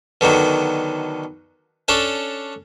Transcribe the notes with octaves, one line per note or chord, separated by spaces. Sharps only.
B2 D3 D#3 F#3
C#4 D4 A4 C#5